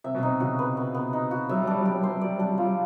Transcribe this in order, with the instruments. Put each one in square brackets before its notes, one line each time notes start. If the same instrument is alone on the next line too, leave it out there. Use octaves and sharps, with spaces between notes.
[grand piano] C3 [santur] E5
[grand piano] B2
[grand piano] C3 [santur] D#4
[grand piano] C#3 [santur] F#4
[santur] B4
B3
B3
D#4
F#4
[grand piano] F#3 [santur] E5
[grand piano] G3
F#3
[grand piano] G3 [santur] D4
[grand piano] F#3
[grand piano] G3 [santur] G4
[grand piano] F#3
G3
[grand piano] F#3 [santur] C5
[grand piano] G3
[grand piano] F#3 [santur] D5
[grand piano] G3
F#3
[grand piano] G3 [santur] D4
[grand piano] F#3
[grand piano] G3 [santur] F4
[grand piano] F#3